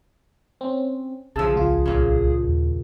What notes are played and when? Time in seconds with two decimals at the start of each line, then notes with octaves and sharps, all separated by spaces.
0.61 C4 C#4
1.36 A#1 C#3 F3 G#4 A5 E6
1.54 C#2 F4
1.86 B1 A#2 C#3
2.45 D#2